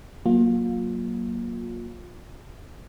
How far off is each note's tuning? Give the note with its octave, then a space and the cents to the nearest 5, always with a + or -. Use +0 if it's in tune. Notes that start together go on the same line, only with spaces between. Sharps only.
F#3 +0 A#3 +10 F4 +30